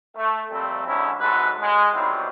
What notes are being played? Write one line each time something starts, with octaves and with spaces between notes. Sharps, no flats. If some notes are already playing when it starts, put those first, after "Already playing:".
A3
F2 A#2 G3 A3 C4
D3 F#3 G#3 C#4 E4
G#2 C3 F#3 F#4 A4 B4
G#3
D#3 E3 F#3 G3 B3 C4